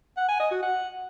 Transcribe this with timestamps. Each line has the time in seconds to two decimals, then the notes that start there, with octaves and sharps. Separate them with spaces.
0.17 F#5
0.28 G#5
0.40 D#5
0.51 F#4
0.63 F#5